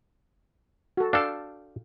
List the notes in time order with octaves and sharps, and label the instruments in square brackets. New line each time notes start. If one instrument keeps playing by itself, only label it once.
[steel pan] F#4 A4
[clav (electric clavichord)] D4 A4 [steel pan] F5 G5 A5